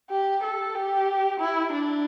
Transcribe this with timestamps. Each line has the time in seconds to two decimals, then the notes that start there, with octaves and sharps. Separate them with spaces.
0.10 G4
0.44 A4
0.75 G4
1.40 E4
1.73 D4